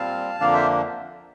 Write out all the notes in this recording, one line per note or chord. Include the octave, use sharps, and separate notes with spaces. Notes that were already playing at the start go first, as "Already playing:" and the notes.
Already playing: A#2 G3 C4 F5 A5
F2 D3 F3 A#3 D4 D5 F5
C5 E5